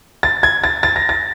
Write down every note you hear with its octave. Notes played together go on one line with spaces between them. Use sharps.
A6
G#6
A6
A6
A#6
A6